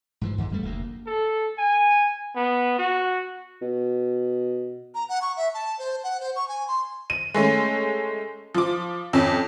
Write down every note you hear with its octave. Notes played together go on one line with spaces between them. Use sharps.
G#2 E3 F3
F2 G#2 C#3 E3
D1 G3 A3
F1 D2 A#3
A4
G#5
B3
F#4
B2
A#5
F#5
C#6
E5
A5
C5
F#5
C5
C#6
G#5
C6
D#7
G#3 A3 C#4
F3 D6
F2 C#4